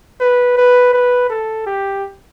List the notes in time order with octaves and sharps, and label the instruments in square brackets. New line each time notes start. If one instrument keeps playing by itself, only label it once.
[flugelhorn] B4
B4
B4
A4
G4